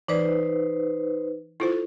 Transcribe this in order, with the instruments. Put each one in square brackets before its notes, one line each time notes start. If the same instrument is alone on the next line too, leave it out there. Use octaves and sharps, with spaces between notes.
[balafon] E3 D5 [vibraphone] D#4 B4 C5
[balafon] E4 F4 C5 [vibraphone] A4